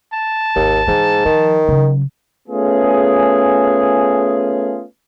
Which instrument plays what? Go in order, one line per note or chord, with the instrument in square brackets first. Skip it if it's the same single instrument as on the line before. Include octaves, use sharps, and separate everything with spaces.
[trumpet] A5
[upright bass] G#1 [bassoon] D#2
[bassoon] G#2 [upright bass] E3
[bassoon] D#3 [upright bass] F3
[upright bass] C#3 F#3
[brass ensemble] A3 B3 C#4 F4 G#4